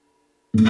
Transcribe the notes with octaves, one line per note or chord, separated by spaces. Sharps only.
A2